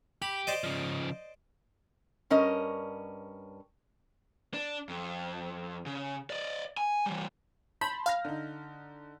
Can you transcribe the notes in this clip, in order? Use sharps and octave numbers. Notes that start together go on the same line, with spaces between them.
G4 B5
C5 D5 D#5
C#3 F3
G2 C#4 A#4 D#5
D4
F2
C#3
D5 D#5
G#5
E3 G3
A5 B5 C6 G6
F5 B5 F6 A#6
D3 D#4